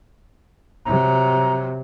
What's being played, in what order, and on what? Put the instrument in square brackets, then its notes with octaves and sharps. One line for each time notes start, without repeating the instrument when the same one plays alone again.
[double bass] C3 F#3 [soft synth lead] A#5